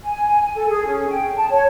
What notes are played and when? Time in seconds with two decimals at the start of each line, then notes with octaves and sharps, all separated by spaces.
0.03 G#5
0.55 A4
0.70 G#4
0.86 C#4
1.09 G5
1.36 A5
1.51 C#5